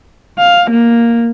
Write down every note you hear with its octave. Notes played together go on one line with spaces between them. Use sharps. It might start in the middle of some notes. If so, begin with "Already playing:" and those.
F5
A#3